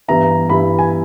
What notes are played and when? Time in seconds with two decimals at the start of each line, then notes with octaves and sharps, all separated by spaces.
0.08 G2 E3 G3 B3 E4 A#5
0.49 G2 E3 G3 B3 E4 B5
0.79 G#5